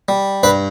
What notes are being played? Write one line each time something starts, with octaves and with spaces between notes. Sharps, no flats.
G3
G2 B4